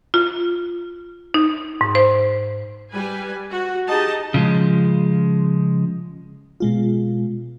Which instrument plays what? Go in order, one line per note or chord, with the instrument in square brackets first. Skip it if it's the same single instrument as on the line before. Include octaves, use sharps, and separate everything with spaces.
[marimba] F4
D#4
G#2
C5
[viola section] G3 B4 G#5
F#4
D#4 G4 G#4 D#5 A5
[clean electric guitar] C#3 F3 G#3
[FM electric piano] B2 G#3 F4